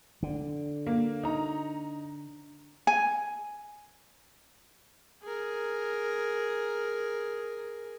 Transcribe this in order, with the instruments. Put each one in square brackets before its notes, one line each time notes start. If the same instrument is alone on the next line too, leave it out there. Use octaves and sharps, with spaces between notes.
[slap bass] D3
[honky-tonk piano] A#3
D#4 A#5
[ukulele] G#5
[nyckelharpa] G#4 A#4